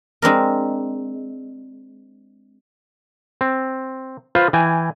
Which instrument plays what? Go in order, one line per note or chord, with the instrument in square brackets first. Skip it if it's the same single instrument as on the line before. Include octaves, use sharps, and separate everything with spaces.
[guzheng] G#3 C4 D4 A#4
[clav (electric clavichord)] C4
F4 B4 C5 F5
E3 G5 G#5